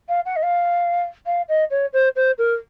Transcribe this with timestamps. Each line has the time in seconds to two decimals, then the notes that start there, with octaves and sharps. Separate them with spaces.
0.09 F5
0.26 F#5
0.36 D#5
0.43 F5
1.26 F5
1.49 D#5
1.71 C#5
1.93 C5
2.16 C5
2.38 A#4